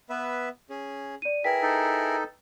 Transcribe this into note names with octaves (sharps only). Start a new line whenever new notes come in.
B3 B4 E5
C#4 G#4
D5 D#7
E4 G#4 A#4 B4 G5 B6
D#4 A4